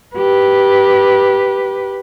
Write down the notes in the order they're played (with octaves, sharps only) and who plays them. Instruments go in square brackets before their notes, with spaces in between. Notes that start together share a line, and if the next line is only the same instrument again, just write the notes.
[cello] G4 B4